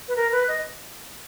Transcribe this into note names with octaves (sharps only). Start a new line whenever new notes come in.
B4
A#4
B4
D#5